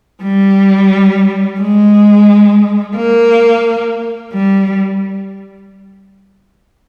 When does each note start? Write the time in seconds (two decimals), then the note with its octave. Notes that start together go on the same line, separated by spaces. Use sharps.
0.23 G3
1.60 G#3
2.96 A#3
4.33 G3